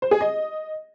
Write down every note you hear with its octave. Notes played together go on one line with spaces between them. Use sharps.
C5
G#4
D#5